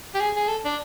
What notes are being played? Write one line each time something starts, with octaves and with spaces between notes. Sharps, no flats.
G4
G#4
G#4
A4
D4